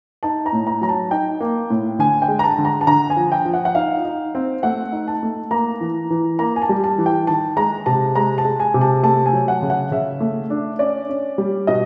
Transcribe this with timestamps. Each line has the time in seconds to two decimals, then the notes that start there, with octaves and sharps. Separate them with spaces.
0.23 D#4 A5
0.46 A#5
0.53 A2
0.67 A#5
0.81 F#3 A#5
0.89 A5
1.11 D#4 G5
1.41 A#3
1.70 A2
1.99 D3 G#5
2.22 G5
2.28 G#3
2.39 A#5
2.44 A5
2.58 D3
2.65 A#5
2.81 A5
2.87 D3 A#5
3.10 G#5
3.17 F3
3.32 G5
3.45 F3
3.54 F#5
3.65 F#5
3.75 D#4 F5
4.05 D#4
4.35 C4
4.63 A3 F#5
4.92 D#4
5.08 A5
5.23 A3
5.51 A#3 A#5
5.81 E3
6.10 E3
6.39 A#3 A#5
6.56 G#5
6.62 A5
6.69 G3
6.84 A5
6.98 E3
7.06 G5
7.27 D#3 A5
7.57 G#3 A#5
7.86 C3 A5
8.16 G#3 A#5
8.38 A5
8.45 G#3
8.60 G#5
8.74 C3
8.81 A5
9.03 A3 A5
9.26 G#5
9.33 F#3
9.48 F#5
9.62 C#3
9.70 F#5
9.91 C#3 E5
10.20 A3
10.50 D4
10.79 C#4 D5
11.09 C#4
11.38 G3
11.67 B2 D#5